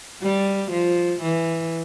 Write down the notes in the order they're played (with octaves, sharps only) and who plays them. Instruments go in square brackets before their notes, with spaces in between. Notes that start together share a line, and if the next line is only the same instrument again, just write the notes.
[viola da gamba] G3
F3
E3